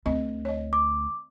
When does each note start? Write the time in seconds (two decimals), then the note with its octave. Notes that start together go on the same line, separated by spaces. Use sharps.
0.06 D2 C4 D#5
0.45 C#5 D#5
0.73 D6